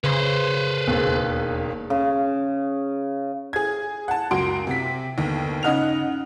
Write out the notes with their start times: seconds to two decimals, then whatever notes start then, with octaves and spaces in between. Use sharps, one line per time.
0.04 C#3 B4 C5
0.87 E1 D#2
1.90 C#3
3.53 G#4 G#6
4.08 F#5 A5
4.31 C#2 F#2 F#4 C6 D7
4.67 C3 B6
5.18 G1 D#2
5.63 C#3 D#4 D#5 F#5 F6 F7